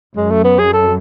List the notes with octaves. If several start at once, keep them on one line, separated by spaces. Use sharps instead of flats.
F#2 G#3
A3
B3
G#4
A4